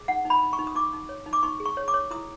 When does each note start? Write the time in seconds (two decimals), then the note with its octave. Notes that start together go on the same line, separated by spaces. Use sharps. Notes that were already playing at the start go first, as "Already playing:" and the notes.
Already playing: G#4
0.08 D#4 F#5
0.25 D#4
0.30 B5
0.43 D#4
0.53 C#6
0.59 D#4
0.67 D#6
0.75 D#4 D6
0.93 D#4
1.09 C#5
1.26 D#4
1.33 D6
1.43 D#4 C#6
1.60 G#4
1.65 C#6
1.77 C#5
1.88 D6
1.94 C#5
2.11 E4 D#6